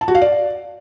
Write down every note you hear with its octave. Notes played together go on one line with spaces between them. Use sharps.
A5
F#4
F5
D5